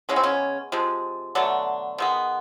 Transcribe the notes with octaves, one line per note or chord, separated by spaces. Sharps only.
E3 G#3 B3 C#4
C4
C#3 C#4
C3 F3 G#3
B2 D3 F#3 A3 D4
D#3 G#3 B3